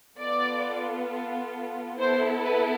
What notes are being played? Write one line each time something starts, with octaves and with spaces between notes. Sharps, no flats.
B3 F4 A4 D5
B3 E4 A4 C5
B4